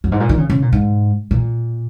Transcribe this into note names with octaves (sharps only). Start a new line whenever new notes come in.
F#2
G#2
A#2
D#3
C#3
C#3
A#2
G#2
A#2